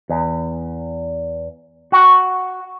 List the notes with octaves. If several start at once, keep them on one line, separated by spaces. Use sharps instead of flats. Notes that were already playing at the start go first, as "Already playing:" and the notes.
E2
F#4